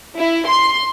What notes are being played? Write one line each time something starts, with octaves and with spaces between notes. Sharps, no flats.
E4
C6